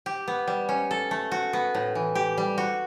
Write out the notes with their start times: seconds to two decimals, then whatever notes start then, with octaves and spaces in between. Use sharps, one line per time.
0.06 G4
0.28 B3
0.47 G3
0.69 C#4
0.91 A4
1.11 A3
1.32 F#4
1.53 B3
1.75 A2
1.95 E3
2.15 G4
2.38 G3
2.58 F#4